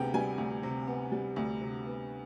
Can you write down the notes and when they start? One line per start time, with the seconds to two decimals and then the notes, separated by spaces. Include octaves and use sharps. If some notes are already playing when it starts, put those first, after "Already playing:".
Already playing: D2 C3 B3 G#4 G5
0.14 G3 G#5
0.38 D2
0.63 C3
0.87 B3
1.12 G3
1.36 D2
1.61 C3
1.86 B3